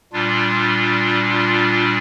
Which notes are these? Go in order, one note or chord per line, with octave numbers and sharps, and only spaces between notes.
A#2 G3 D4 F4
F4